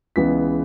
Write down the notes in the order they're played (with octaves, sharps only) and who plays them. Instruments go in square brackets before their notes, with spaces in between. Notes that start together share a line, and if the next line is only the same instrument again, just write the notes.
[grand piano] C#2 C#3 E3 G#3 B3 B6